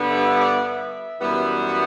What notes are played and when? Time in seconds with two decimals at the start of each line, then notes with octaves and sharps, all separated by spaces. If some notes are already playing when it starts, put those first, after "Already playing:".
Already playing: G2 D3 G3 B3
0.10 E5
0.26 E5
0.40 D5
0.56 E5
1.20 F#2 E3 G3 B3
1.67 F#5